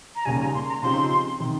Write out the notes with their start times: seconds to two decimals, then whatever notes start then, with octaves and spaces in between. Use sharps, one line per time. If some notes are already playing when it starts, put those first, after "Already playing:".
0.16 A#5
0.25 D#2 C#3 G3 G#5
0.40 A#5
0.54 C6
0.68 A#5
0.82 C#3 F3 C4 D#4 G4 C6
1.40 C3 D#3